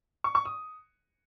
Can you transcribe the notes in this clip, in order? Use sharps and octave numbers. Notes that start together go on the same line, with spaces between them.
C#6
C#6
D#6